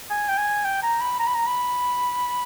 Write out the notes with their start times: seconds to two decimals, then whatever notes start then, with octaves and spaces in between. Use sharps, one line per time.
0.11 G#5
0.29 G5
0.38 G#5
0.65 G5
0.83 A#5
1.01 B5
1.19 A#5
1.27 B5
1.35 A#5
1.47 B5